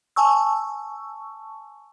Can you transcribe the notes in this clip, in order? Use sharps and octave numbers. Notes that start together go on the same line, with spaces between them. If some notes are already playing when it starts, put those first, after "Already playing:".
G#5 A5 C#6 E6